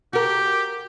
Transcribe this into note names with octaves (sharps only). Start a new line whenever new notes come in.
F#4 G4 A#4